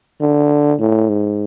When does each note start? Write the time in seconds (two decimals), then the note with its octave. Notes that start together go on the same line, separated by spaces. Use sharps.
0.21 D3
0.79 A2
1.09 G#2